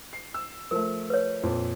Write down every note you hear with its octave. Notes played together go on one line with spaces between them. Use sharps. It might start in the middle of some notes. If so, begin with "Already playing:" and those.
C7
E6
F3 A3 A#4
B4 C#5
F2 A#2